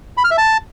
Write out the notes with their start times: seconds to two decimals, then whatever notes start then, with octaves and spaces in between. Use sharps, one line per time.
0.17 B5
0.24 F6
0.31 E5
0.38 A5